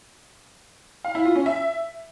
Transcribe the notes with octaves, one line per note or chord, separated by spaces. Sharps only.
F5
E4
F4
C#4
E5